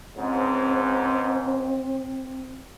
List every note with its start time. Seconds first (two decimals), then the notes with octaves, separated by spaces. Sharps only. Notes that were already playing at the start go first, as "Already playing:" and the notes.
0.17 C#2 G#2 C4